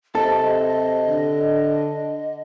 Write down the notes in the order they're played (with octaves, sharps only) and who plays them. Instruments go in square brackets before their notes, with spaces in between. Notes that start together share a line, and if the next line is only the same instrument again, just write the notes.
[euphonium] C3 [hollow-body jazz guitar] A4 [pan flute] D#5
[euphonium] D3